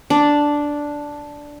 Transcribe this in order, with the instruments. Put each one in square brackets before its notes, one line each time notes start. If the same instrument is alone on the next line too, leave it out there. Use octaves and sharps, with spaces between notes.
[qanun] D4